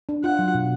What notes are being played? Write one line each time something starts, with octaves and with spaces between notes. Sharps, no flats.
D4
F4 F#5
F#3
B2